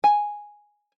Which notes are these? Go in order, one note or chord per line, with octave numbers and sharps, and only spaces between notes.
G#5